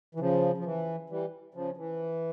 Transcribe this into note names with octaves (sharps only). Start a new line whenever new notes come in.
E3
C#3 F3
F3
E3
E3 G3
C#3 F3
E3